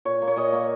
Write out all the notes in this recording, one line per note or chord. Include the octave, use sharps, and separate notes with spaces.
A#2 C#5
A#3
C#5
A#2 D#5
A#3